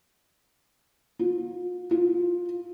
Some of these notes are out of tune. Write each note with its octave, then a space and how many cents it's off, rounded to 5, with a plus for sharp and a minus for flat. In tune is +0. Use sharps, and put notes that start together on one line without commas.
F4 +40
F4 +10